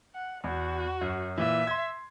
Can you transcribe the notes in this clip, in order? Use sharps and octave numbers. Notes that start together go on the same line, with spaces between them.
F#5
E2 F#4
F#2
A#2 E3 E5
C6 G#6